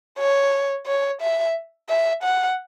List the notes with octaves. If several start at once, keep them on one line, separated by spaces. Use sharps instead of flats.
C#5
C#5
E5
E5
F#5